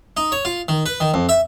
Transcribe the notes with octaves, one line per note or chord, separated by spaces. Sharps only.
D#4
C#5
F4
D#3
B4
D#3
F2
E5